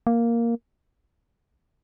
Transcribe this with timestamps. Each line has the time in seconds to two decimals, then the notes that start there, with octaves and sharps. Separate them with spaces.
0.07 A#3